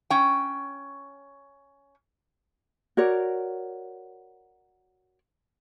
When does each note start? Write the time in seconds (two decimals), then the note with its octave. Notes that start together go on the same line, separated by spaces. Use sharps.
0.10 C#4 G5
2.97 F#4 A#4 C#5 D5